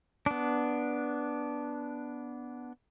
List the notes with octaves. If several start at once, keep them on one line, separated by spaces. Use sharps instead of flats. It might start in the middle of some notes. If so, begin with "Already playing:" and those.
B3 D4